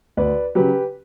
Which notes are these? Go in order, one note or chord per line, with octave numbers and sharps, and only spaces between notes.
D2 B4 D5
C#3 F#3 G4 B4